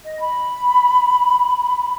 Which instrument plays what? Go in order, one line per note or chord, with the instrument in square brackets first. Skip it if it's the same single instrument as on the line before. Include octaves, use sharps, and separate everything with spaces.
[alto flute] D#5
B5